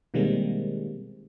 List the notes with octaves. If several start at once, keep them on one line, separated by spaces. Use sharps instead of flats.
B2 D#3 G3 G#3 A#3 C4